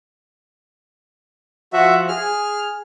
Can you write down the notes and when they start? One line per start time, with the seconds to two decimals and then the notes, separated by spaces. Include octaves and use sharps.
1.73 F3 F#4 E5
2.08 G#4 F6